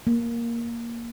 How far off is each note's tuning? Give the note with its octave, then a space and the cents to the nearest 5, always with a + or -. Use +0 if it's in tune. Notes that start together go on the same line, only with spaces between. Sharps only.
A#3 +5